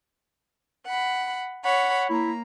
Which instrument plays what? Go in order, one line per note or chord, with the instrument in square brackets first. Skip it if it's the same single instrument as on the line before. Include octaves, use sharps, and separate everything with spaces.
[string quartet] F#5 B5
[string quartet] C#5 B5 [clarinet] F#5
[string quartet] A#3 A#5 [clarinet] E4